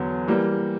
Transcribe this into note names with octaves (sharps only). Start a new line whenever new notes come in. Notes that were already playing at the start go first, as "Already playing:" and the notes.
Already playing: E2 D3 F#3 B3
E3 G3 A#3